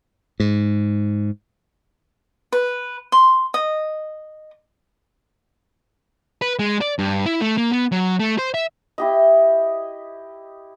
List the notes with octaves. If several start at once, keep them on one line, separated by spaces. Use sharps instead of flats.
G#2
B4
C6
D#5
B4
G#3
D5
G2
E4
A3
A#3
B3
F#3
A3
C5
E5
E4 G4 D#5